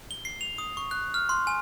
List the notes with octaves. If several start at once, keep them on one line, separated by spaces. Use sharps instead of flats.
G7
C7
F7
D#6
C#6
F#6
F6
C6
G#5